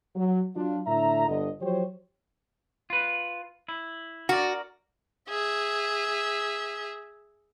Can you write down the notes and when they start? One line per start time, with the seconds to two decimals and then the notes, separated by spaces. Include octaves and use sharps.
0.16 F#3
0.56 F#3 D4 F4
0.87 A2 D3 D4 E5 A#5
1.28 G1 D3 D#5
1.61 F3 F#3 G4 C5 C#5
2.90 F4 B4
3.69 E4
4.29 F#4 A#4 D5
5.29 G#4 E5